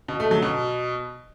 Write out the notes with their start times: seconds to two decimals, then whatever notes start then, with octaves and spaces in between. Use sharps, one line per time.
0.08 B2
0.20 A3
0.31 F#3
0.42 B2